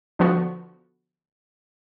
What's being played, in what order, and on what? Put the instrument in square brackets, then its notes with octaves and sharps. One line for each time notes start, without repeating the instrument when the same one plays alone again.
[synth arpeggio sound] D3 F3 B3 F#4